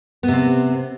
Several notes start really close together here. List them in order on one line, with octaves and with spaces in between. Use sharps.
B3 C3 C4